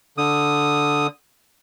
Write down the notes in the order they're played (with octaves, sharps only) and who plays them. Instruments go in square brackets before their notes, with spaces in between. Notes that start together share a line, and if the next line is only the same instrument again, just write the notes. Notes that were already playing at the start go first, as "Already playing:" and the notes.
[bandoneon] D3 D#6